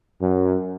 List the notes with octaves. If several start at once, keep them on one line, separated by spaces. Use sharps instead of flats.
F#2